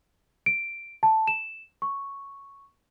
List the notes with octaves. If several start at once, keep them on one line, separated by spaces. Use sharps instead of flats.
D7
A5
E7
C#6